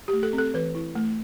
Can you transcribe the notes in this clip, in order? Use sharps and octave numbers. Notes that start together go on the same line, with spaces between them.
G4
A3
A4
C4
A4
E3 B4
E4
A3